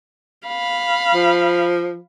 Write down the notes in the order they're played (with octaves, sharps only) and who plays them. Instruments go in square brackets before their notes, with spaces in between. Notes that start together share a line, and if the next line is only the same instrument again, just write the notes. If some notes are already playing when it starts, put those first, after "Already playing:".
[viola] F5 B5
[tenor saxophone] F3